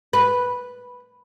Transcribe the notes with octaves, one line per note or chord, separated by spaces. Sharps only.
B4